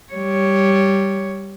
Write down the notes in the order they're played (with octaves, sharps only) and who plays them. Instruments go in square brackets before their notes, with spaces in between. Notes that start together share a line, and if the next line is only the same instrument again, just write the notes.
[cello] G3 C#5